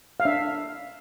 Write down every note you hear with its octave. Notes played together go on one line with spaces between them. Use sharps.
F5
D4 E5